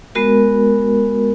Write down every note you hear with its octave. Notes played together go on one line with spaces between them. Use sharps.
G#3 B3 F#4 A#4